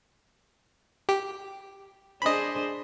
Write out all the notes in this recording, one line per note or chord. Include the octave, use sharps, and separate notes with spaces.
G4
D4 G#4 C5 D#5 B5